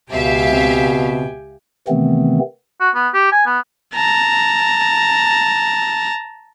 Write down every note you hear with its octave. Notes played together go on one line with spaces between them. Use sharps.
C#2 B2 G4 E5 F5 G5 G#5
C#3 C4
C3 D#3 E3 A3 B3 C4
F#4
B3
G4
G#5
B3
A5 A#5